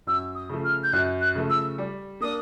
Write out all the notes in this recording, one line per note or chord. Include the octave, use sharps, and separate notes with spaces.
F#2 E6
D#6
C#3 F3 A3
F6
G6
F#2 F#6
F#6
C#3 F3 A3
E6
G3
A#3 D4 D#6